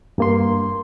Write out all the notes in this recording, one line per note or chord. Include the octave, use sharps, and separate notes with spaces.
G2 A#3 C6